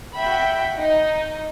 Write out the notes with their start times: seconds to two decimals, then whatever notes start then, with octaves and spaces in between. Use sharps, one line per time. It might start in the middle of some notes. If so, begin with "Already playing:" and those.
0.16 F#4 E5 G5 B5
0.76 D#4